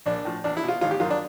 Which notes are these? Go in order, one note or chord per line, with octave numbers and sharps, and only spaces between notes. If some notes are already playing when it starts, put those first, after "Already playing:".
A#1 D4
A2 F3
E2 D4
E4
B2
F4
G#1 F4
G4
F#2 D#3 F4
D4